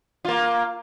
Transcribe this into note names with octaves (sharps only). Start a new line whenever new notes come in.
A#3 F4